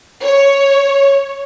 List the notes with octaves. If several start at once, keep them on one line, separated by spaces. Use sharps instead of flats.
C#5